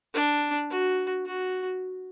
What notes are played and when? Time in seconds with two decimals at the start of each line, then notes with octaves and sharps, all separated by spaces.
0.14 D4
0.70 F#4
1.26 F#4